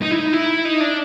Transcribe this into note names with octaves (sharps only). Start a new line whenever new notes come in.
D#4
E4
D#4
E4
D#4
D4